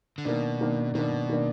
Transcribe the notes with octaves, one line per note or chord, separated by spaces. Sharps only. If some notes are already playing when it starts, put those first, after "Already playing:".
D3
B2 D#3 A#3 D4
D#3 A#3 D4
B2 D#3 A#3 D4
D#3 A#3 D4